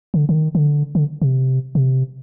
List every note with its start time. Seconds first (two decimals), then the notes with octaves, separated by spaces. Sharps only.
0.14 D3
0.29 D3
0.34 D#3
0.55 D3
0.95 D3
1.22 C3
1.75 C3